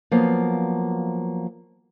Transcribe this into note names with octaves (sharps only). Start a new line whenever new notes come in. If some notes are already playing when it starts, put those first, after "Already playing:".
F3 F#3 A#3 B3